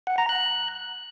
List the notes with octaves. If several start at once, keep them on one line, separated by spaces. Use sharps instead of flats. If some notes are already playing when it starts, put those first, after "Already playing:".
F#5
A#5
F#6